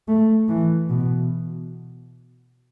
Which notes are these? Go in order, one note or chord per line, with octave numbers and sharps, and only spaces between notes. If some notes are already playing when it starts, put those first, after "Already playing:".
A3
E3
B2